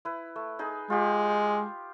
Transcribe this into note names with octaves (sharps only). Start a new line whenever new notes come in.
E4 B4
A3
D#4 G#4
G#3 F4 G4